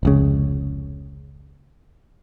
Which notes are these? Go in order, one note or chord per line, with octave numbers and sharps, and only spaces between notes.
F1 C#2 C#3